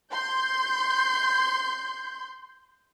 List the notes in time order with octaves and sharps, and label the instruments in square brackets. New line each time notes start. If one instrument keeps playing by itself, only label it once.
[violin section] C6 G6